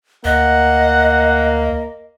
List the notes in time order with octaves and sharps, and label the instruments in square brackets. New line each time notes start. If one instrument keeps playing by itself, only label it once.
[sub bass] D2 [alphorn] A#3 [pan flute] D#5 [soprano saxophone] F#5